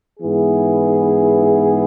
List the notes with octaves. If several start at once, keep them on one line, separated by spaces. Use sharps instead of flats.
G#2 E3 B3 E4 G#4